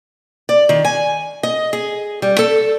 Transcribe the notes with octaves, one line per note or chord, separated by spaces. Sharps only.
D5
D#3
G#5
D#5
G#4
G3
A4